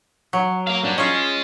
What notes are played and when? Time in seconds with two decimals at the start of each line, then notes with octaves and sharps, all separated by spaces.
0.33 F#3
0.67 A#4 F5
0.84 G3 D4
0.98 C#4 F4 G#4 D#5